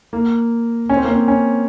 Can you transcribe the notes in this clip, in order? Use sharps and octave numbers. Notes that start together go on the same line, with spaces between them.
A#3
C#4
C4
A#3
C4
C#4